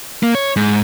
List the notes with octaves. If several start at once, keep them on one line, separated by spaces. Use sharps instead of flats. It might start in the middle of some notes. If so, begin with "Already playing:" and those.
A#3
C#5
G#2